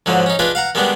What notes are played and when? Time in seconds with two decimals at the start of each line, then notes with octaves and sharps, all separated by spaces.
0.06 G#2 D3 F3 F#3
0.26 C#4 D#4
0.39 D4 F4 G#4 B4 D#5
0.55 F5 F#5 A#5
0.75 D#3 G3 G#3 B3 D4